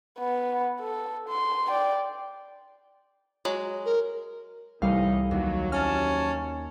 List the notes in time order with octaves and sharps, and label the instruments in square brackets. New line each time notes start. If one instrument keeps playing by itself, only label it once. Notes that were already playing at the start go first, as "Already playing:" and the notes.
[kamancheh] B3
A4
C6
D5 G5
[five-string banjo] F#3 G#3
[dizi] A#4
[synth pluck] C2 G3 [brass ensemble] A2 E3 D#4 [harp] F5
[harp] D#2 [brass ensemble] F#3
[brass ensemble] C2 F#3 A5 [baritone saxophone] C#4 [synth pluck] F6